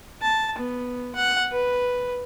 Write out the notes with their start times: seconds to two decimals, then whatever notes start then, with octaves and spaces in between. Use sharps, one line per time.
0.22 A5
0.58 B3
1.15 F#5
1.52 B4